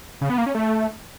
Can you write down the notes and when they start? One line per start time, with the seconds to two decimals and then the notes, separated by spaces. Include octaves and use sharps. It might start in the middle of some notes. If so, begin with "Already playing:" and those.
0.21 C#3
0.30 B3
0.38 A#3
0.46 C#4
0.55 A3